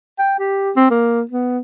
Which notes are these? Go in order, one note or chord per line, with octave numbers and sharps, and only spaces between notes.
G5
G4
C4
A#3
B3